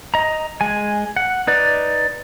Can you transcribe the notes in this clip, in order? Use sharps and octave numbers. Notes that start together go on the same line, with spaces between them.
D#5 A#5
G#3 G#5
F#5
D#4 B4 D5